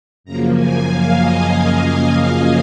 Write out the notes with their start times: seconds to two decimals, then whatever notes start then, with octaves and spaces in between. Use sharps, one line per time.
0.24 F#2 C#3 F3 A#3 A#5
0.55 G#5
0.87 F5
1.16 D#5